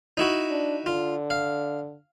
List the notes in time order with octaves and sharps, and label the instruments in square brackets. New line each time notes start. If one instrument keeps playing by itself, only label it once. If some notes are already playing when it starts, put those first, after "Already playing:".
[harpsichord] D#4 E4 F#4
[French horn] D4
[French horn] D3 [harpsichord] F4
[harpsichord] F5